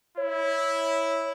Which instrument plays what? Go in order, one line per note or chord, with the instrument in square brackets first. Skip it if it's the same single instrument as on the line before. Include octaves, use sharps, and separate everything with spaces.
[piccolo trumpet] E4 [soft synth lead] C#5